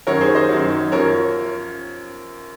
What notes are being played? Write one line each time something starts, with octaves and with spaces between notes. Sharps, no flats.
F#2 D#3 F#3 A#4 C#5
G#4 C5
C5 D#5
F#2 D#3 F#3
F#2 F3 A#4 C#5